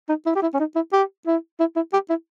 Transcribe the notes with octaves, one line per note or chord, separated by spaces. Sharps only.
D#4
E4
G4
E4
C#4
D#4
E4
G4
E4
E4
E4
G4
E4